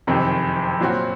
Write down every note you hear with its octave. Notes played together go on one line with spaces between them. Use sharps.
F#1 F2 C3 D#3
A#2 F#3 C4 F#4